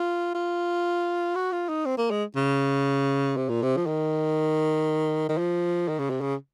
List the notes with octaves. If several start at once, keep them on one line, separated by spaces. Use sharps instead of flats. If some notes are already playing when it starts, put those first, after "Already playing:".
Already playing: F4
F4
F#4
F4
D#4
C4
A#3
G#3
C#3
C3
A#2
C3
F3
D#3
D#3
F3
D#3
C#3
C3
C#3